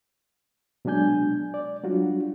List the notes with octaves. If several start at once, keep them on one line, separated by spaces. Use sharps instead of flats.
B2 F#3 G#3 D4 G#5 G6
D5
F#3 G3 D4 F4 F#4